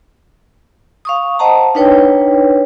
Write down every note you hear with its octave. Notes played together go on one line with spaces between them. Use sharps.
F5 C#6 D#6
C5 D#5 F#5 A5 A#5
D4 D#4 B4 C#5 G5